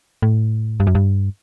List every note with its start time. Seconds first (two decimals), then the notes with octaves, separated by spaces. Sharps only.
0.22 A2
0.80 G2
0.87 F#2
0.95 G2